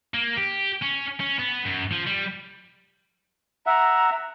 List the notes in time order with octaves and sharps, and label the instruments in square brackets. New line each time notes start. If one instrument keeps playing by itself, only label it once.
[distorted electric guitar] A#3
G4
C#4
C#4
B3
F#2
F3
G3
[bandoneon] E5 F#5 [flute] A#5